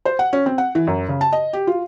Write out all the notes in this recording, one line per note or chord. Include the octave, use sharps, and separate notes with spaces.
C5
F#5
C#4
C4
F#5
E3
F#2
C#3
A5
D#5
G4
F4